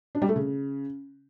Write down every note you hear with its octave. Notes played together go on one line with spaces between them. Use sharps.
D4
G3
A3
C#3